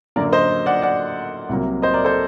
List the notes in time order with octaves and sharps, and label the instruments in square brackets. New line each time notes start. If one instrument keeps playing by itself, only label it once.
[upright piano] F#2 D3 F#3 A#3 A#4 D5
C5 D#5
D5 F#5
D5 F#5
C2 C3 F#3 A#3
C5 D#5
A#4 D5
A4 C5